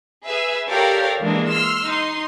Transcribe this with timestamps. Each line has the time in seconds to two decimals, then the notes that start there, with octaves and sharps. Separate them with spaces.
0.25 G#4 B4 E5
0.69 G4 A4 A#4 C#5 D5 F5
1.20 E3 G#3 A#3 D4
1.50 C6 E6 F6
1.86 D#4 C6